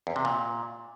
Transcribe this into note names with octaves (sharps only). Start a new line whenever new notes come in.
E2
C3
A#2